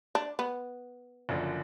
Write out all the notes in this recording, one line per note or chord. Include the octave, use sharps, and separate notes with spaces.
D4
B3
F#1 F#2 D3 F3